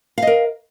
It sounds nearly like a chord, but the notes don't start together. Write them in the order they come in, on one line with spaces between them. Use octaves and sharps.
F5 D#5 A#4